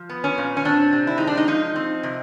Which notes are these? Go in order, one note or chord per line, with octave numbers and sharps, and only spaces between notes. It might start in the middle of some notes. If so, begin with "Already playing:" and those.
Already playing: F3
B3
C#4
A#2
C#4
C4 D4
C3
E4
G#3 D#4
D4
D#4
F3 D#4
C4
C3